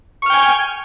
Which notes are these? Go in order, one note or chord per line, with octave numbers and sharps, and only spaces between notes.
G5 G#5 C#6 F6